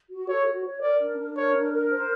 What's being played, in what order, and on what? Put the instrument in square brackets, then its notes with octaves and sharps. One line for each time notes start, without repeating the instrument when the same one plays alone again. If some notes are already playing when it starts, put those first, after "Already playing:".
[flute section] F#4
[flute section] A4 [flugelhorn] C#5
[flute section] F#4
C#5
[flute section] A#4 [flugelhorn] D5
[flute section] D4
D4
[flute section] A#4 [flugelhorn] C#5
[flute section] D4
A#4
C5